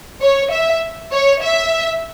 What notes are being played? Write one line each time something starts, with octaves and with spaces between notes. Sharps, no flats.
C#5
E5
C#5
E5